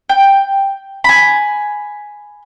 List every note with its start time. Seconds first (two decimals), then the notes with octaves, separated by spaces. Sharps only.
0.09 G5
1.04 G#5 B5